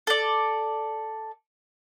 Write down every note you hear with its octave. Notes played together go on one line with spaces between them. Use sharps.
A4 D5